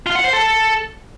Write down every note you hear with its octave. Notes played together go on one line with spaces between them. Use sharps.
F4
F#5
C5
A4